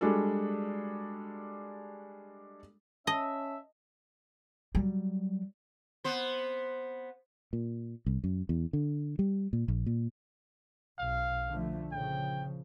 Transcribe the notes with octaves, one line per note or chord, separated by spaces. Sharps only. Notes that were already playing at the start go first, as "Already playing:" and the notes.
G3 G#3 D4 F#4 A4
C#4 D#5 E5 A5
F#3 G3
B3 C5
A#2
C2
F#2
E2
D3
G3
A#2
A#1
A#2
B1 F5
D3 F3 A3
A#2 C#3 F3 G5